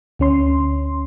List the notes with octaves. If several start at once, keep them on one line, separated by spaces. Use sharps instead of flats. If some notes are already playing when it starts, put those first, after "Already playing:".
D2 C#4 C6